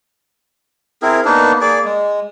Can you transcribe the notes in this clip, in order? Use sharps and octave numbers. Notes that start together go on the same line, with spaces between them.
C4 E4 G#4 A#4
A#3 B3 D4 D#4
A#3 G#4 D5
G#3